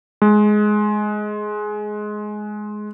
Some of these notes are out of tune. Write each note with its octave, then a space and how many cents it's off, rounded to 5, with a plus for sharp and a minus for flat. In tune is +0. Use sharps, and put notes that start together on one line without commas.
G#3 +15